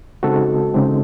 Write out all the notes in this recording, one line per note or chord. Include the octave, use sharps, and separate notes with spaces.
C#3 G#3 C4 D#4 F#4 A4
C#3 G#3 C4 D#4